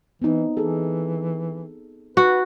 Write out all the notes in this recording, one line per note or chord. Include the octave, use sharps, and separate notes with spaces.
E3 B3 C4 D#4
E3 G#4 A4
F#4 B4